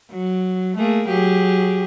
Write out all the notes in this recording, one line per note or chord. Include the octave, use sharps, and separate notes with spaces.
F#3
A3 A#3 G#4
F#3 G4 G#4